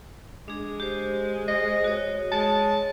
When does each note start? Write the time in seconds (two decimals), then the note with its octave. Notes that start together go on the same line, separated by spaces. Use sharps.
0.48 G#3 D4 G#4
0.80 G4 C5
1.48 G#4 C5 D#5
1.84 F#4 C#5
2.32 G#3 C#5 A5